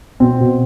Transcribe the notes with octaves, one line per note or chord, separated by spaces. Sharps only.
B2 C4
B2